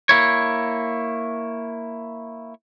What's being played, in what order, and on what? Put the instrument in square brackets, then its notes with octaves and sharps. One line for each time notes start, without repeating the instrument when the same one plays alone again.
[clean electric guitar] A#3 E4 C#5